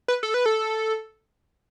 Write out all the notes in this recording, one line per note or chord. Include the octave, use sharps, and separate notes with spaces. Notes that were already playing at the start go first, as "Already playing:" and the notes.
B4
A4
B4
A4